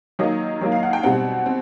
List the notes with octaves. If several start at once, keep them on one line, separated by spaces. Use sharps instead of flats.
D#3 F#3 A#3 D#5
D#3 F#3 A#3
F5
F#5
G5
B2 G3 C4 F#5
C4